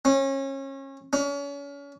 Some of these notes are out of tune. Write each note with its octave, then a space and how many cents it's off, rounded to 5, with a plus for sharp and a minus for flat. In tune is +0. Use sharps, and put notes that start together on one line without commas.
C#4 -30
C#4 +35